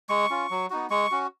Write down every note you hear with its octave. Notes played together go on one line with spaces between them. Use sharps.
G#3 C#6
C#4 F4
F#3
B3 D#4 F#4
G#3 C#6
C#4 F#4